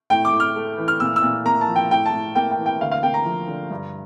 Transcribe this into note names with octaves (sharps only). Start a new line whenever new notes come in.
A2 G5
D6
A2
F6
A3
E3
F6
A#2 E6
E6
A#2
A#3 A#5
A5
F3
G5
A2 G5
A5
A2
A#3 G5
G5
E3
G5
D2 F5
F5
A#3 G5
A#5
F3
D3
G2